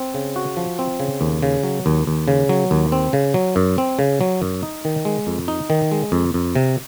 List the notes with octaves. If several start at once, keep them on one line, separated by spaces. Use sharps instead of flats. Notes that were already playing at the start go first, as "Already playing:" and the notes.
Already playing: C4
C#3
F#4
F3
C4
C#3
D#2
C#3
F#3
D#2
D#2
C#3
F#3
D#2
C4
C#3
F#3
F#2
C4
C#3
F#3
F#2
D#4
D#3
G#3
F2
D#4
D#3
G#3
F2
F2
C3